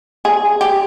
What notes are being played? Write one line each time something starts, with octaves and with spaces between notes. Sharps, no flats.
G#4
G4